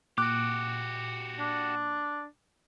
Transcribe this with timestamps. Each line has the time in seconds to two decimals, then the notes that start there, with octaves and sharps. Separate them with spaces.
0.18 A#2 F#4 G4 D6 F#6
1.39 D4